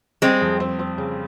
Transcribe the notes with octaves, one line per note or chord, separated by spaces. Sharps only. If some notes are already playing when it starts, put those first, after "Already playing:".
G3 G#3 C4
F2
C4
C4
C#3